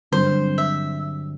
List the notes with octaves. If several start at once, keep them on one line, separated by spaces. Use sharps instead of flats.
G2 D3 F#3 C4 C5
E5